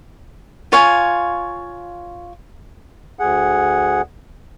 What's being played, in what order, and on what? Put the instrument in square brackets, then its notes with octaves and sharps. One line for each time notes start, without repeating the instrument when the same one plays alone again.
[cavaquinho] F4 C#5 F5 G#5
[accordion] D2 G#4 F#5